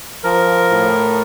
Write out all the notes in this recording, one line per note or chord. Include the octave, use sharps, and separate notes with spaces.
F3 A#4
A2